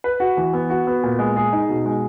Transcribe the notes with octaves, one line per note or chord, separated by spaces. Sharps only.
B4
F#4
E3
B3
F#4
B3
A#2
G#3
G#4
D#4
B2
G#3